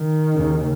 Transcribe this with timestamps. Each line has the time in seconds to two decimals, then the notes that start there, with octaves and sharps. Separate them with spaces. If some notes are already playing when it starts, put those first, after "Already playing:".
Already playing: D#3
0.35 D#2 C#3